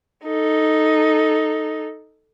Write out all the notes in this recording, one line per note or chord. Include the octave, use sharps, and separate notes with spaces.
D#4 A4